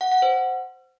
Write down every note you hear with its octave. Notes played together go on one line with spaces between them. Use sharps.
F#5
F#5
C5